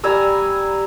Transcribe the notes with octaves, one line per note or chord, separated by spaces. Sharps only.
G3 G#5 A#5 E6